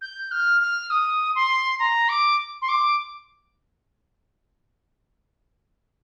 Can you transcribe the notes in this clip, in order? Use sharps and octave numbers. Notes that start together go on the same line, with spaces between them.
G6
F6
F6
D#6
C6
A#5
D6
C6
D6